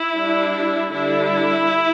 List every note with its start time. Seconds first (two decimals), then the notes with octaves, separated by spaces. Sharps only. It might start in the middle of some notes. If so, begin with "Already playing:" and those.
Already playing: E4
0.16 G3 D4
0.93 D3 G3 D4 E4